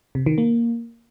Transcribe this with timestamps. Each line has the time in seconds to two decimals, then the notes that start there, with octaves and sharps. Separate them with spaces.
0.15 C3
0.26 D#3
0.38 A#3